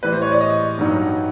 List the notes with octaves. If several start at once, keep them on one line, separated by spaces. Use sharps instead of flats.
A2 E3 G3 B4
C5
C#5
D5
D#5
G2 D#3 F#3